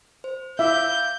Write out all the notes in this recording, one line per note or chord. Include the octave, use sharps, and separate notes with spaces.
C5
E4 E5 F5 D6 E6 G6